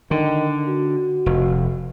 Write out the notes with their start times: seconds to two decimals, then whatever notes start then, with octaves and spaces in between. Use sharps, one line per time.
0.11 D3 D#3
0.68 F#4
1.26 F1